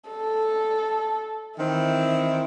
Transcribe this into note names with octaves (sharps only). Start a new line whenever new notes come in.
A4
D#3 E3 C4 E4